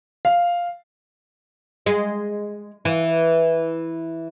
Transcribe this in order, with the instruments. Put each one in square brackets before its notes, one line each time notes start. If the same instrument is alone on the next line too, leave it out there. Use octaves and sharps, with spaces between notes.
[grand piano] F5
[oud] G#3
E3